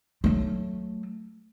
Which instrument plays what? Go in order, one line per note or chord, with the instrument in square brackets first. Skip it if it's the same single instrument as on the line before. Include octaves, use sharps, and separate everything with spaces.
[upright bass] F#3 A3